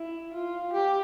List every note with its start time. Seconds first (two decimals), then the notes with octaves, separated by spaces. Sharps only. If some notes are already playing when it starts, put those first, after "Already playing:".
Already playing: E4
0.34 F4
0.73 G4